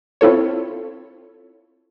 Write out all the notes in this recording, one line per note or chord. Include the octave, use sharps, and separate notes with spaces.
C4 E4 F4 A4 C#5